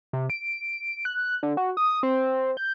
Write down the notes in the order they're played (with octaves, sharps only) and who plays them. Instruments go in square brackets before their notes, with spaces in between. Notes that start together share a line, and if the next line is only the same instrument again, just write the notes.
[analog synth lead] C3
D7
F#6
D3
F#4
D#6
C4
G6